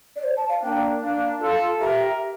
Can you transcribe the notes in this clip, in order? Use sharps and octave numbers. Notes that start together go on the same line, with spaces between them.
D5
C5
A5
F5
A#3 D4 G5
A#3 D4 F5
F4 A4
G4 A#4 E5